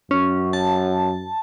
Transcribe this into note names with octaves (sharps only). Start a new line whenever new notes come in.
F#2 C#4
A5